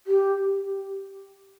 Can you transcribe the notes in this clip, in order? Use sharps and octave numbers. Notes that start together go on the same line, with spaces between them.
G4